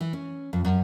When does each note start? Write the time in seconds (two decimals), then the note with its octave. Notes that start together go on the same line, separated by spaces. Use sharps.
0.01 E3
0.13 C#4
0.53 F2
0.65 F#2